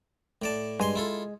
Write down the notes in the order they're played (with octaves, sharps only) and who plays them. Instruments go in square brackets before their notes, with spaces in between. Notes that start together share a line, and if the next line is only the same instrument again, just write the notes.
[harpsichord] A2 D5 A5
[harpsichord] G2 G#5 C6 [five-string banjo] G#3
[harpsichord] E4 F4 A4